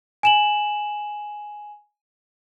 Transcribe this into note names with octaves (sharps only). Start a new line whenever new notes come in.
G#5 E7 F#7